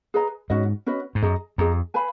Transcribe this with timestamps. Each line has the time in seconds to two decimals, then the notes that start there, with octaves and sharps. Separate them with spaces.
0.14 G#4 B4 D#5 A#5
0.50 G#2 C#4 F#4 B4 D#5
0.86 C#4 F#4 B4 D#5
1.15 G#2
1.22 F#2 G#4 D#5 A#5
1.58 F2 G#4 D#5 A#5
1.94 B4 F5 G#5 B5